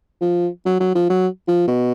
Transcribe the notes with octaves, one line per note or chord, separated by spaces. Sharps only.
F3
F#3
F#3
F3
F#3
F3
B2